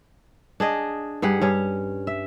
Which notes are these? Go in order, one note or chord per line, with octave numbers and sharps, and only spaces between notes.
D4 G#4 D#5
G2 G3 G#4 F#5
G2 C#4 C#5
E5